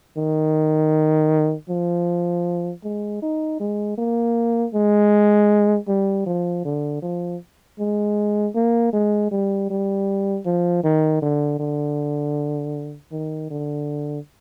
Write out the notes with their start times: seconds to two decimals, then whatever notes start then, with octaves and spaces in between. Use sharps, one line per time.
0.17 D#3
1.70 F3
2.84 G#3
3.22 D#4
3.60 G#3
3.98 A#3
4.74 G#3
5.88 G3
6.26 F3
6.65 D3
7.02 F3
7.79 G#3
8.55 A#3
8.93 G#3
9.31 G3
9.70 G3
10.46 F3
10.84 D#3
11.22 D3
11.60 D3
13.12 D#3
13.50 D3